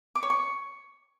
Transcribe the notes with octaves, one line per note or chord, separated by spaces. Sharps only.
D6
C#5
C#6